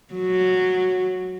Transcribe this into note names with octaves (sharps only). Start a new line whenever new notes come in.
F#3